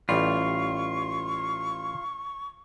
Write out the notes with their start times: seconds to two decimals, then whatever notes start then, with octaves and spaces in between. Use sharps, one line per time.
0.09 A1 G3 F4 C#6